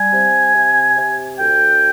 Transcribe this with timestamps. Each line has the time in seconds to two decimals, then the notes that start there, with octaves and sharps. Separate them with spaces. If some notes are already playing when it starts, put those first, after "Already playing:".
Already playing: G3 G#5
0.11 C3
0.54 C3
0.97 C3
1.38 D2 G5